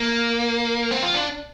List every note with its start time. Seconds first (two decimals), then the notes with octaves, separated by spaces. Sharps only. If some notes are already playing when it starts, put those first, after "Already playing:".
Already playing: A#3
0.91 C4
1.03 F4
1.14 D4